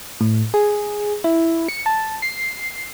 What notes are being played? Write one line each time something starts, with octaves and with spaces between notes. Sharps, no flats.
A2
G#4
E4
C#7
A5
C7